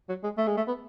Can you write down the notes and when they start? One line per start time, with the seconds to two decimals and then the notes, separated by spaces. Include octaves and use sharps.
0.09 F#3
0.23 G#3
0.38 A3
0.47 G#3
0.57 A3
0.67 B3